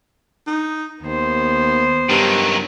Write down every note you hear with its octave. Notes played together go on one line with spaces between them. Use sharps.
D#4
D#2 B3 C5
G2 D#3 F#3